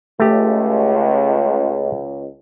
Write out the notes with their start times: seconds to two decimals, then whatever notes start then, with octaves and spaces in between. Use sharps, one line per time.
0.20 C#2 A3 G4